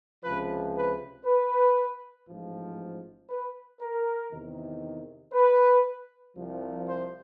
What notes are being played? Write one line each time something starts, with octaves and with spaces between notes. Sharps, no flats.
C#2 C3 F3 B4
B4
B4
A1 G#2 F3
B4
A#4
E2 C3 D#3
B4
C2 C3 F3
C5